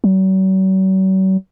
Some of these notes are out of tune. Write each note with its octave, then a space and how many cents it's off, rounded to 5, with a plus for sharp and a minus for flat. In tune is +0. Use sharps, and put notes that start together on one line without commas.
F#3 +45